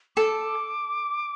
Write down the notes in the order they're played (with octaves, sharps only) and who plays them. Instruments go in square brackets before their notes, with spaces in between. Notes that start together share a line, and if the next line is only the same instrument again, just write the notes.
[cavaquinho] A4 [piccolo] D6